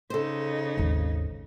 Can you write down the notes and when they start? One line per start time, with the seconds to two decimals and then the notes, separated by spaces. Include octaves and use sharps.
0.10 C#3 D#4 A4 C5
0.77 G#1 D#2